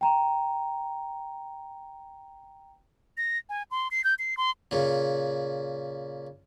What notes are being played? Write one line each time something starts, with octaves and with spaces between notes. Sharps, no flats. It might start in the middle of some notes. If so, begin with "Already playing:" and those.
G5 A#5
A#6
G#5
C6
C7
G6
C7
C6
A#2 C#3